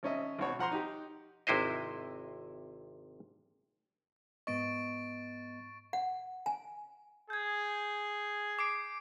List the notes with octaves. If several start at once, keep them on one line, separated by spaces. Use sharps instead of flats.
G#1 C#4 D#5 E5
G#1 B2 F#4 C#5
F3 F#5 A#5 C6
D#4 G4
G#1 C3 E4 C5 D#5
G#2 B3 D#5 C#6 A6 D7
F#5
G#5
G#4 G6 G#6
D6 C7 D7